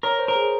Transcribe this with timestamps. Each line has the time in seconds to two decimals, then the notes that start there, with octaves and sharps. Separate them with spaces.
0.03 A#4 C#5
0.19 C5
0.28 A#4
0.35 G#4